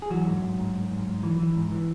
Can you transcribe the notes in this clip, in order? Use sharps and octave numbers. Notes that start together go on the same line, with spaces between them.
G#4
E3 F#3 F#4
G#2
G#2
G#2
G#2
G#2
G#2
E3
E3
G#2
E3